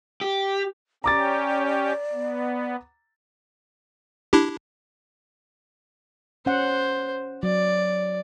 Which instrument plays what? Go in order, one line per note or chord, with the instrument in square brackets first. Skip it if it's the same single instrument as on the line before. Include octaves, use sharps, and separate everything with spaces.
[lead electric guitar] G4
[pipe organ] C#4 G4 [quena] D5 [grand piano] A#5 D6 A6
[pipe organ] B3
[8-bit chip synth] D4 E4 G4
[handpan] C#4 F#5 [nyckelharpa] C5
[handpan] F#3 [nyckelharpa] D5